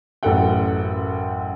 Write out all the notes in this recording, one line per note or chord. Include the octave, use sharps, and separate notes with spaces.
A1 F#2 A4 F#5 G5